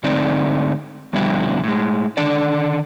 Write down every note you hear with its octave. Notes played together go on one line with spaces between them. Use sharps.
G#2 D3 A3 C4 D#4 D5
F2 B2 D3 G3 E4
A2 G#3
D3 D#3 D4 A4 D5